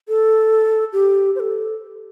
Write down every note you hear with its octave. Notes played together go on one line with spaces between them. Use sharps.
A4
G4
C5
A4